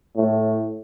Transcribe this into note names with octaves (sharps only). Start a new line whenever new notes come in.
A2